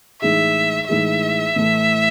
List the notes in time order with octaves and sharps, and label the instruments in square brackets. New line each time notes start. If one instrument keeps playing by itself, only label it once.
[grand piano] A2 E3 G#3 D#4 G#4 [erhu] E5
[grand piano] A2 E3 G#3 D#4 G#4 [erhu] E5
[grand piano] A2 E3 A3